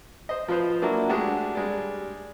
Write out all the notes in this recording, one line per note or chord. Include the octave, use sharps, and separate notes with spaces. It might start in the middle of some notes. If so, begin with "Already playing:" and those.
C5 D#5
F3 F4 B4 C5
F#3 A#3 D4 E4 F#4
G#3 A3 D4 F#4 G4
G3 G#3 D5